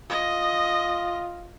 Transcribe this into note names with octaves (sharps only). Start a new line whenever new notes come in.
F4 D#5